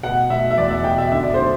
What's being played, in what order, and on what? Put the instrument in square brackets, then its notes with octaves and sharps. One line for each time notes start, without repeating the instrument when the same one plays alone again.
[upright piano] B2 F#5
B2 E5
E5
E2 D5
E5
B2 G5
E5
D3 E5
D5
D3 C5